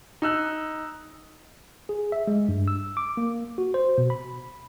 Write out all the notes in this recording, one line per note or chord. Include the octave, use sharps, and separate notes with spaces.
D#4 E6 F#6
G#4
E5
G#3
G2
E6
D6
A#3
F#4
C5
B2
B5